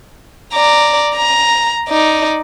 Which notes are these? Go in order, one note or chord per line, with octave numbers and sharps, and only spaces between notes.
D5 A#5
A#5
D#4 D5